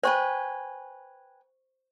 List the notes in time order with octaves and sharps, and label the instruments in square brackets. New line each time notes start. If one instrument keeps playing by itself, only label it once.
[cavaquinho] B4 G5 G#5 [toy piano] C5 C#6